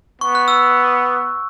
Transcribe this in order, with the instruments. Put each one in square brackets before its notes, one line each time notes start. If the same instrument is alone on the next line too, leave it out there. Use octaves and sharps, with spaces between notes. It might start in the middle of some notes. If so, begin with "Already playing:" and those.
[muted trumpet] B3 [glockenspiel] C#6
[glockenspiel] F#6
E6